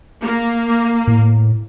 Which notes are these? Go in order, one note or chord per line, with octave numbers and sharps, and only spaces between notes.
A#3
A2